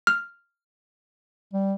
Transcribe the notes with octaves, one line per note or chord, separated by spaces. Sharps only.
F6
G3